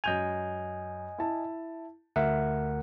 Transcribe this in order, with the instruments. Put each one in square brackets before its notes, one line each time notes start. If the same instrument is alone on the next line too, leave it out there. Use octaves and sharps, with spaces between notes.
[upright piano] F#2 G6 F7 [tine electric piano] D#5 G#5
[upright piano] E4 A5
[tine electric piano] D2 A#4 F#5 [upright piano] E5